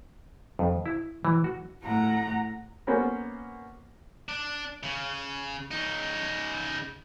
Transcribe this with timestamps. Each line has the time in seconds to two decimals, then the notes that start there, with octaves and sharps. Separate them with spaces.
0.59 F2
0.86 E4
1.25 E3
1.44 F#4
1.83 A2 F#5 A#5
2.87 A#3 B3 C#4 A#4 C5
4.29 D4
4.83 C#3
5.71 C#3 D#4